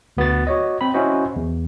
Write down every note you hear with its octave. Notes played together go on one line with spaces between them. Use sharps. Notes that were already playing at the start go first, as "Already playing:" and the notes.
D2 B3 F#4 A6
F#4 C#5 D#5
C4 B5
C#4 E4 F#4 C5 D#5
E2